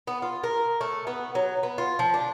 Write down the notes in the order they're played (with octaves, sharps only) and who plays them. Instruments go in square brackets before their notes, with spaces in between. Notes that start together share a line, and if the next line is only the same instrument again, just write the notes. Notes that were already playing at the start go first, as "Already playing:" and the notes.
[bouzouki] B3
F4
A#4
A3
B3
F#3
B3
F4
F3
D4